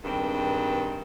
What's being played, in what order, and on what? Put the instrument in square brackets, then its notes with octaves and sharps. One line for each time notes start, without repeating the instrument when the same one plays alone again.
[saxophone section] G2 D#3 G#3 B3 C4